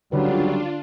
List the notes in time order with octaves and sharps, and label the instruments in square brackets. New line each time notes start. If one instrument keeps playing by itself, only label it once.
[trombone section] C#2 F#3 [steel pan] D3 B4 [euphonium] G3 [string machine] D4 F4